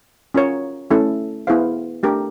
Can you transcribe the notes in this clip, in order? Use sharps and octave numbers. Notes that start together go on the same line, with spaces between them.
C#4 F4 A#4 C#5
A3 C#4 E4 A4
B3 E4 G#4 C5 F5
A3 D4 G4 A#4